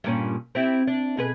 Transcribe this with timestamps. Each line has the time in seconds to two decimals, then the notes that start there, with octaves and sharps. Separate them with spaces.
0.04 G2 A#2 C#4
0.55 C4 E4 G4
0.87 D4
1.17 B2 G#4 B4